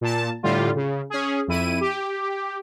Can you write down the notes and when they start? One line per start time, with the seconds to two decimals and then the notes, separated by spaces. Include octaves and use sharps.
0.01 A#2 A5
0.43 A2 D3 G3 F4
0.75 C#3
1.10 C#4 G#4
1.48 F2 E4 D#7
1.81 G4